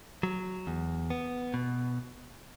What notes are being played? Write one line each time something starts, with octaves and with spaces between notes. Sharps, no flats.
F#3
E2
B3
B2